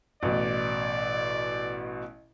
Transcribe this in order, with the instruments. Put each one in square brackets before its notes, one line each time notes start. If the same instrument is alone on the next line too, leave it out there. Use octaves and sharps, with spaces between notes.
[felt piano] A1 B2 [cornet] D5